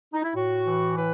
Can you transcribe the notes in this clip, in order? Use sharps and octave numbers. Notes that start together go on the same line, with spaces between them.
D#4
E4
A2 F#4
E3
A2 B4